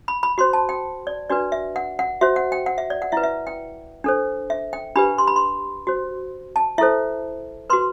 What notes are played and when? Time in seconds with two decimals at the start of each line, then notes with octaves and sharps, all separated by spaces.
0.08 B5
0.23 B5
0.38 F#4 C5 C6
0.53 A5
0.69 G5
1.07 D5
1.30 D4 F#4 B4 D5
1.52 E5
1.76 F#5
1.99 F#5
2.21 F#4 C5 E5
2.36 F#5
2.52 G5
2.66 F#5
2.78 E5
2.90 D5
3.02 F#5
3.12 E4 B4 E5
3.23 E5
3.47 G5
4.04 D4 A4 C5
4.50 E5
4.73 G5
4.96 D4 G4 B4 B5
5.18 C6
5.27 B5
5.36 C6
5.87 F#4 C5
6.56 A5
6.78 E4 A4 C5 E5
7.70 B4 C6
7.73 F#4